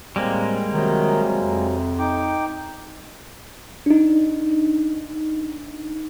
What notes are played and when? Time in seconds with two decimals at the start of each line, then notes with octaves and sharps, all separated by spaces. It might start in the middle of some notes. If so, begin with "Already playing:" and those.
0.16 A2 G3 G#3 A#3 C4
0.72 C3 D#3 F#3
1.38 F2
1.99 D#4 G5 D6
3.86 D4 D#4